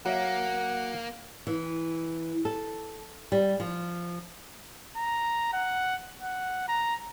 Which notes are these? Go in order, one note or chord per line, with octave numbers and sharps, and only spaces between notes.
F#3 A#3 E5 F#5
E3
A4
G3
F3
A#5
F#5
F#5
A#5